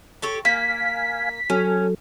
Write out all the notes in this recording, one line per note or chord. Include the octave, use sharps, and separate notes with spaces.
G4 A4 C#5
A#3 F5 G#5 B6
F#3 C#4 A4